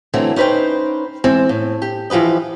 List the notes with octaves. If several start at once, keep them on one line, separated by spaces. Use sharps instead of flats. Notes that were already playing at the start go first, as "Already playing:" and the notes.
D3 E3 F#3 A3 C4
C#4 D#4 B4 C5 G5
E3 G#3 C4
A2
G4
E3 F3 G4 B4 D#5